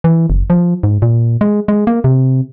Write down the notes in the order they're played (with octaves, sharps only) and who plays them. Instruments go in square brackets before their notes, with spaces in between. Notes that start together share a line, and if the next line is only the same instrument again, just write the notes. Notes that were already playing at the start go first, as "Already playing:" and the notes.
[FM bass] E3
F#1
F3
G#2
A#2
G#3
G#3
A#3
C3